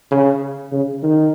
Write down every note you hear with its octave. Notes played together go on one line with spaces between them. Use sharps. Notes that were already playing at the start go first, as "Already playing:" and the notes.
C#3
C#3
D#3